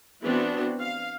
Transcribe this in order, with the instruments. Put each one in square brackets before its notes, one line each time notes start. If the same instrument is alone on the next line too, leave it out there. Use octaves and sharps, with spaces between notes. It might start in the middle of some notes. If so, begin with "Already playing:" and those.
[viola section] E3 B3 C4 D4 F#4
F5